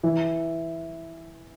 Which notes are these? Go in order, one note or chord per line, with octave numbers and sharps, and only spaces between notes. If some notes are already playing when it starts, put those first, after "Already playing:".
E3